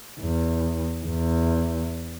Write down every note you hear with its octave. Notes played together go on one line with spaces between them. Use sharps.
E2
E2